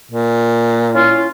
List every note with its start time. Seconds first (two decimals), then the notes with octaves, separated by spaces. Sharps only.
0.11 A#2
0.94 C#4 E4 F4